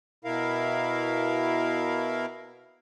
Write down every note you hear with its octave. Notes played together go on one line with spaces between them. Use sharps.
B2 E4 A#4 F5